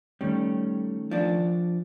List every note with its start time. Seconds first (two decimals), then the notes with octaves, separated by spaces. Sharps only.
0.21 D#3 G3 A3 C#4
1.11 F3 D4